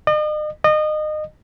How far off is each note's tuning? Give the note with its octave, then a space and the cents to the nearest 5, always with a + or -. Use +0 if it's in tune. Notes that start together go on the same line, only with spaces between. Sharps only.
D#5 -40
D#5 -25